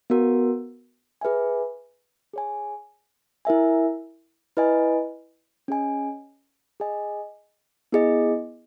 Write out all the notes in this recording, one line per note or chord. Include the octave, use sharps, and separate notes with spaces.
B3 F#4 A#4
G#4 B4 E5 G#5
G#4 C#5 G#5
E4 A#4 E5 G#5
E4 B4 D#5 G#5
C#4 G#4 D#5 G#5
G#4 D#5 G#5
B3 E4 G#4 D#5